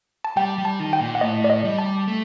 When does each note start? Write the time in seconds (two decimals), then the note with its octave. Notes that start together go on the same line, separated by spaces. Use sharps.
0.24 A5
0.36 G3 G5
0.58 G3
0.65 A5
0.79 D#3
0.93 G5
1.01 A#2
1.15 F#5
1.21 A2 D#5
1.44 D5
1.50 D#5
1.64 G3
1.78 A5
2.08 A3